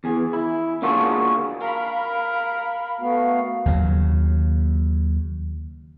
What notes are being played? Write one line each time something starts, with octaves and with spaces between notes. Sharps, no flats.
E2 G#4
E4
A#3 D4 F4 F#4 G#4 A4
A#4 F5 B5
A3 B3 F#4 F5
D#2 C#3 F#3